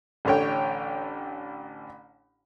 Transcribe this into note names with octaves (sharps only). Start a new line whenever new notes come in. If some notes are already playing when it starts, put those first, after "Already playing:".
A1 D3 C#5 G5